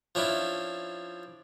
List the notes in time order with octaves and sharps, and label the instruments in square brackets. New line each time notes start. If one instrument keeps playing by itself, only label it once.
[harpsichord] F3 C#4 D4 E4